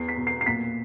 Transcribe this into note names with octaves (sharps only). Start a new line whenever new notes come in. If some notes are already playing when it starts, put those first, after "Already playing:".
Already playing: E2 C7
B6
B2
C7
C7
A#2 B6